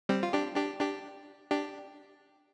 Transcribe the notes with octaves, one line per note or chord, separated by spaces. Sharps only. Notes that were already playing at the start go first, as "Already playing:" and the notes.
G3 C4
F4
D4 G4
D4 G4
D4 G4
D4 G4